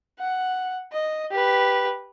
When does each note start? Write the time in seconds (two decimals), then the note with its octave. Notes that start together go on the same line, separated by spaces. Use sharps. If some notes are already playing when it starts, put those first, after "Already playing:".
0.20 F#5
0.93 D#5
1.31 G4 B4